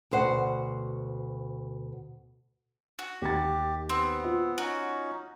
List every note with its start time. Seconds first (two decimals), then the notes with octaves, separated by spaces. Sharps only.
0.11 D2 B2 C5 F#5
2.99 F#4
3.22 D#2 G4 A6
3.89 B3 C4
4.24 F4
4.58 C#4 D#4 F#4